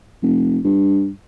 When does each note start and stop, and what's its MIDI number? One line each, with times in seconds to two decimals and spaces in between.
0.22 0.58 29
0.64 1.09 43